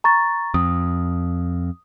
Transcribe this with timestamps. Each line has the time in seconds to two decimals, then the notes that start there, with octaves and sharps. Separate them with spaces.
0.04 A#5 C#6 A6
0.54 F2 D#6